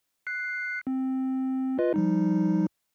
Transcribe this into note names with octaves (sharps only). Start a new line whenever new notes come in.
F#6 C7
C4
F4 B4 D#5
F3 G3 D#4